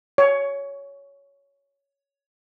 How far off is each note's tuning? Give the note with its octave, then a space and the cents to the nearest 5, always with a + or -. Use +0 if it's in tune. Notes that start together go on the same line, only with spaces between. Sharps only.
C#5 +10